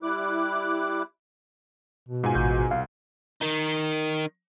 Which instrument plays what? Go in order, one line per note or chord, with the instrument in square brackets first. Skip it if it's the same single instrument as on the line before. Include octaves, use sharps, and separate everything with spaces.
[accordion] G3 E4 D6 F#6
[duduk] B2
[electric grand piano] G#2 F4 G#5
[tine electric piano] A1 F#4 G6
[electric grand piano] C2 [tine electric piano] F5
[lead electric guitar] D#3 D#4